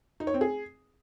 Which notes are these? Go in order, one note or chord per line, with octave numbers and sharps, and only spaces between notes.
D#4
C#5
C4
G#4